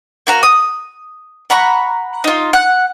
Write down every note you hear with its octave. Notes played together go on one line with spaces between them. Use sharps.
A#3 F#4 A#5
D#6
F#5 A#5 B5 C#6
D#4 F4
F#5